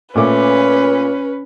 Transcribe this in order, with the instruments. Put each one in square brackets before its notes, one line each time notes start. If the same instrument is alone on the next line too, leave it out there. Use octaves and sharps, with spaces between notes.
[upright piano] A#2 A3 D6 [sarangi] C#4 [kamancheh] B4